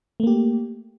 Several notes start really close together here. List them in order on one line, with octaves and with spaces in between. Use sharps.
A3 A#3 G4